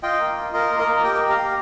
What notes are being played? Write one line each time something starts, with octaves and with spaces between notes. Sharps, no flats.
F4 D#5 G5
A#3
F4
F4 A#4 D#5
A#3
A#4 D#5
A#3
G4 D#5 G5
G4
F5 A#5
G4